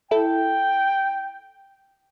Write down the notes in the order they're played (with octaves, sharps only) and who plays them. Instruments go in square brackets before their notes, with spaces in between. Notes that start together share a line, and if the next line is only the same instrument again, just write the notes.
[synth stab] E4 A4 [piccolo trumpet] G5